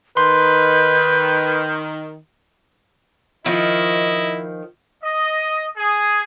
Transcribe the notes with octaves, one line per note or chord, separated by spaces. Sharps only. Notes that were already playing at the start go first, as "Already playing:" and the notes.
D#3 B4 C6 G6
D#3 F3 E4 D#5
D#5
G#4